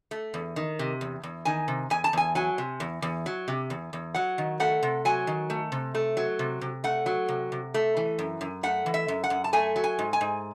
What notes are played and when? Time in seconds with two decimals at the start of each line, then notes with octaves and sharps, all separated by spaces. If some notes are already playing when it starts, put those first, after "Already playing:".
0.11 A3
0.34 E2
0.56 D#3
0.79 C3
1.01 E2
1.23 E2
1.45 D#3 G#5
1.68 C3
1.90 E2 G#5
2.04 A5
2.13 E2 G#5
2.35 F#3 G#5
2.58 C3
2.80 E2
3.02 E2
3.26 F#3
3.48 C3
3.70 E2
3.93 E2
4.14 F#3 F#5
4.38 D#3
4.60 A3 F#5
4.83 C3
5.05 F#3 G#5
5.27 D#3
5.50 A3
5.72 C3
5.95 A3
6.17 F#3
6.39 C3
6.61 C3
6.84 A3 F#5
7.06 F#3
7.28 C3
7.52 C3
7.74 A3
7.97 E3
8.19 F#2
8.41 F#2
8.63 A3 F#5
8.86 E3
8.94 E5
9.08 F#2
9.24 F#5
9.30 F#2
9.44 A5
9.53 A3 G#5
9.76 F#3
9.84 G#5
9.99 G#2
10.13 G#5
10.21 G#2